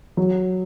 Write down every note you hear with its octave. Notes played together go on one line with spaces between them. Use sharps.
F#3